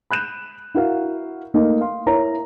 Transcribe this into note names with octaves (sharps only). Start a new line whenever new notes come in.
B5 F#6 G6 E7
E4 F#4 A#4 F5
A3 A#3 D#4
F5 C6
E4 A#4 C#5 A#5